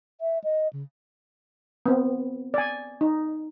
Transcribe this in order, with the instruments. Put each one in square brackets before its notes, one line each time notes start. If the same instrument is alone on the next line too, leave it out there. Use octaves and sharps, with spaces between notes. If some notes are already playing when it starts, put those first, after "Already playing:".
[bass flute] E5
D#5
C#3
[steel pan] B3 C4
D5 G#5
D#4